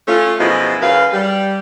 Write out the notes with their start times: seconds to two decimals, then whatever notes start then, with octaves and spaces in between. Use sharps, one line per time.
0.06 A3 C#4 F4
0.38 F#2 B2 F3 G#3 D#4 E4
0.81 F#2 C#3 B4 F5
1.12 G3